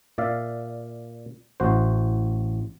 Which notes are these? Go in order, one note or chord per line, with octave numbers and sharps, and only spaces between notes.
A#2 D5 E5 F5
A1 F#4 C5